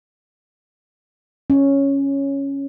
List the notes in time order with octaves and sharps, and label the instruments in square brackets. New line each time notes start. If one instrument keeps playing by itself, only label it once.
[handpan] C#4